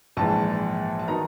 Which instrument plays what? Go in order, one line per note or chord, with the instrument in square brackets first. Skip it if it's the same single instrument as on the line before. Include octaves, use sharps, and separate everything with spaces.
[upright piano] A#1 G#2 E3 A5
A5
D#3 F#3 B3 D#4 A#5